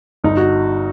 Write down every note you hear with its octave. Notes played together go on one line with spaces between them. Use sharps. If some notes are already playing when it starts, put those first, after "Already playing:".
G1 D#4
F#4